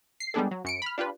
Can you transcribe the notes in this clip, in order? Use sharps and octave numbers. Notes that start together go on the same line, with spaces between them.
C7
G3 G#3 B3 D4 G#4 A4
F#3
F#2 C#7 D7
B5 F6
D4 F4 G4 B4